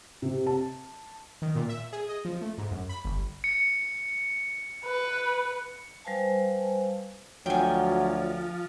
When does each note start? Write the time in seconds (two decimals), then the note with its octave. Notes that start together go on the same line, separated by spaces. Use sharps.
0.22 C3
0.47 A5
1.42 D#3
1.55 A#2
1.69 E5
1.93 G#4
2.09 D#5
2.25 F3
2.41 A3
2.58 G#2
2.71 F#2
2.89 B5
3.05 G1
3.44 C#7
4.85 B4
6.05 G3 B4 C5 F5 G#5 A5
7.46 D2 F3 F#3 G5 G#5